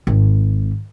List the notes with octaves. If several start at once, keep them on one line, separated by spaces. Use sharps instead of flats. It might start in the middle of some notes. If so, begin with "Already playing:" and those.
G#1